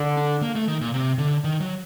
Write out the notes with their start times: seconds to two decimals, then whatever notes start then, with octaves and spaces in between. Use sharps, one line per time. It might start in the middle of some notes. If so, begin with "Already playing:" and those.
Already playing: D3
0.17 D4
0.42 A#3
0.55 A3
0.68 D#3
0.81 A#2
0.94 C3
1.18 D3
1.44 D#3
1.60 F#3